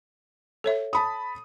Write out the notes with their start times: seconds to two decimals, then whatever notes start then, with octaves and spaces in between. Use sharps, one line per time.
0.64 A4 C#5 E5
0.93 A5 B5 D#6